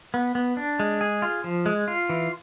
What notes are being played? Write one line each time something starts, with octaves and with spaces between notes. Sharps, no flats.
B3
B3
D4
G#3
G#4
F4
F3
G#3
F4
E3